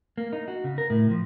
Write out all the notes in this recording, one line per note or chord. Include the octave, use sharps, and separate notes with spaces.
A#3
D#4
F#4
C#3
A#4
A2
F3